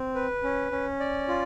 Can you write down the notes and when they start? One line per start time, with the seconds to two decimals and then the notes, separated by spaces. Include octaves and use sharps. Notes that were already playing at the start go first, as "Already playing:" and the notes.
Already playing: C4
0.15 B4
0.43 C#4
0.72 C#4
1.00 D5
1.28 F4